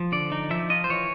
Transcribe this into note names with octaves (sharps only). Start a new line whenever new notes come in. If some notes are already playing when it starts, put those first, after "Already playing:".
Already playing: F3
D3 D5
D#4
F3 E5
F4 D#5
C5
E3 C#5